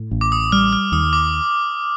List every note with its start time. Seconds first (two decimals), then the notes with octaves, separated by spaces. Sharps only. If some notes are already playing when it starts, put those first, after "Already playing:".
Already playing: A2
0.11 A1
0.21 D6
0.32 D#6
0.52 G3 F6
0.73 F6
0.92 D#2 D#6
1.13 D6